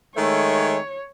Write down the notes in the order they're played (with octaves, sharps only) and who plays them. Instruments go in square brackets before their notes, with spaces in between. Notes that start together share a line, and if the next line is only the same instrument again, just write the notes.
[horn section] D#3 G#3 A3 [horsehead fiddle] C#5